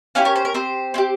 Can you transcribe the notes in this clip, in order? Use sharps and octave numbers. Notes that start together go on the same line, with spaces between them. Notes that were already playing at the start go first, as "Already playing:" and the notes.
C#4 E4 G4 F5 G#5
A#4 C#5
C5
A#4
C4 G4 C5
C4 E4 G4